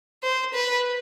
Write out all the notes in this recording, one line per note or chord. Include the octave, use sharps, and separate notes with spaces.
C5
B4